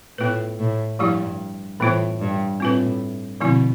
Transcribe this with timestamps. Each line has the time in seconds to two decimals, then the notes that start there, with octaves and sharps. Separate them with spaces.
0.18 A2 B3 F4 B4
0.59 A2
0.99 G2 F3 A3 E4 G4
1.80 A2 E3 B3 F4 C5
2.21 G2
2.60 A2 C4 F4 B4
3.40 B2 D3 F3 A3 C4 E4